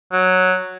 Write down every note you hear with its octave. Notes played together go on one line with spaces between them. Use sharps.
F#3